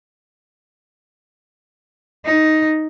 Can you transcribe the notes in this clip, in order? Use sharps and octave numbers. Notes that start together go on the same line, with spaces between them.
D#4